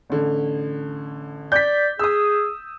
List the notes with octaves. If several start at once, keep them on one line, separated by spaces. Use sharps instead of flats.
A1 D3
D5 G6 B6
G#4 D#6 E6